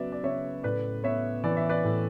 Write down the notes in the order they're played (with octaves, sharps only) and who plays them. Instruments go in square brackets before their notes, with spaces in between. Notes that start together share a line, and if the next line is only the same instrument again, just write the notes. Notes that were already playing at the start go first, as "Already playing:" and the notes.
Already playing: [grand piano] C#3 F#3 B3 B4 D5 E5
D5
C#3 C#5 E5
A2 B4 D5
B3 C#5 E5
E3 D5
E5
B4 D5
A2